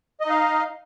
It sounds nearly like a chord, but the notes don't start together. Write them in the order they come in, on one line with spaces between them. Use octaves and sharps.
D#5 D#4 F5